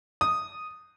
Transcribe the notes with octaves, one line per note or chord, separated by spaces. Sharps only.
D#6